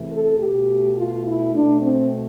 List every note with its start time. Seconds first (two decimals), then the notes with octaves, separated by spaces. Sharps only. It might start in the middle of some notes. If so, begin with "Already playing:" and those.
Already playing: E2 C3 E3 A3
0.10 A4
0.39 B2 A3 G4
0.96 F4
1.25 E4
1.53 B2 A3 D4
1.82 C4